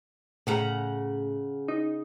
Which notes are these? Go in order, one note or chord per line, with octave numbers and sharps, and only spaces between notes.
A2 C#3 F#5 A#5
D#4